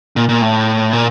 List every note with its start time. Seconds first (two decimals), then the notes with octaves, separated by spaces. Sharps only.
0.16 A#2
0.29 A#2
0.42 A2
0.93 A#2